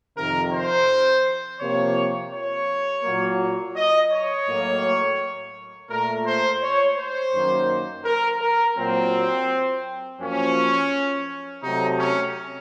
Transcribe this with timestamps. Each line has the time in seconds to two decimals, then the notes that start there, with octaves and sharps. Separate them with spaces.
0.17 F2 C3 D#3 A#4
0.53 C5
1.60 C3 F3 A#3 C#5
2.32 C#5
3.04 A#2 F#3 A#3
3.76 D#5
4.12 C#5
4.48 A2 F#3 A#3
5.90 A#2 A3 A#4
6.26 C5
6.63 C#5
6.98 C5
7.34 F#2 D#3 A#3
8.05 A#4
8.41 A#4
8.77 A#2 F#3 A#3 C4
10.20 F#2 F3 A#3 C#4
11.63 C3 F#3 A3 D#4
11.99 C#4